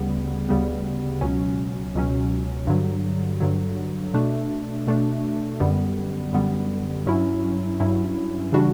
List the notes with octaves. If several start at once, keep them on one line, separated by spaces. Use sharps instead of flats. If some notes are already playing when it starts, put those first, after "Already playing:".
Already playing: D2 C#3 G3 B3
D2 C#3 G3 B3
C#2 B2 F#3 C#4
C#2 B2 F#3 C#4
G2 D3 F#3
G2 D3 F#3
B2 A3 D4
B2 A3 D4
F#2 D3 G3 B3
F#2 D3 G3 B3
G2 F#3 C#4 E4
G2 F#3 C#4 E4
C#3 E3 G3 D4 F#4